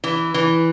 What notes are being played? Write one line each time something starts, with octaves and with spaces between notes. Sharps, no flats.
E3
E3